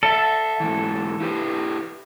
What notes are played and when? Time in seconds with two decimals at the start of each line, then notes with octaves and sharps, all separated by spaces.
0.03 A4 D5 E5
0.60 G#2 E3
1.20 E4 G4 B4